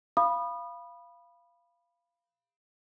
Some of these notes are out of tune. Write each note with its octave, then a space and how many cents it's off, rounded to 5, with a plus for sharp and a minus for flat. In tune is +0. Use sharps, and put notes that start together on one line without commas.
F5 -15 B5 -10 D#6 -30